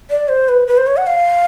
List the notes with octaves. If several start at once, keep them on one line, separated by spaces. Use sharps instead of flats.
D5
C5
B4
B4
C5
C#5
F#5
F5